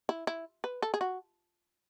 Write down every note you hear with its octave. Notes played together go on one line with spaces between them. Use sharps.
E4
E4
B4
A4
G#4
F#4